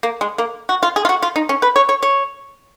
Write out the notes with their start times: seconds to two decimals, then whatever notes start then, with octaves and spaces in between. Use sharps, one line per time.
0.03 A#3
0.21 G#3
0.38 A#3
0.69 F#4
0.83 F4
0.96 G#4
1.05 F4
1.09 F#4
1.22 F4
1.36 D#4
1.49 C#4
1.62 B4
1.76 C#5
1.89 C#5
2.03 C#5